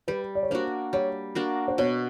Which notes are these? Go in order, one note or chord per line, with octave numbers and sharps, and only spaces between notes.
G3 B4
D5
C#5
A#3 D4 F#4 C5
G3 C#5
A#3 D4 F#4
C5
B2 C#5